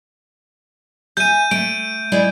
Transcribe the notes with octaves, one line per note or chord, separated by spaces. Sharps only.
E5 G#5 G6 D#7
A3 D7
G#3 E4 D5